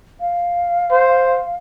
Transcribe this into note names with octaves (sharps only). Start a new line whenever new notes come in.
F5
C5